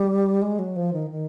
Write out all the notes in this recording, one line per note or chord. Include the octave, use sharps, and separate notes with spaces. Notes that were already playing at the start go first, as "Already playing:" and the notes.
Already playing: G3
G#3
F#3
F3
D#3
D#3